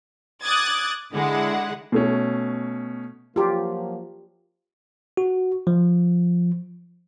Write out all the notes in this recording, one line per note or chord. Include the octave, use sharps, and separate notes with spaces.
D6 D#6 F#6 G#6 A6
D3 G#3 E4 F#5
B2 A3 C#4
F3 F#3 A#3 F4 G4
F#4
F3